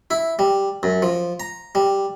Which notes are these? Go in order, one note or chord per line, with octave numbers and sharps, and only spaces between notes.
E4
G3
F#2
F3
A#5
G3